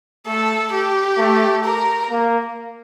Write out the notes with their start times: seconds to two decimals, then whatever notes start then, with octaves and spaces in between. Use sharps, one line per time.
0.27 A3 A4
0.73 G4
1.18 A3
1.64 A#4
2.10 A#3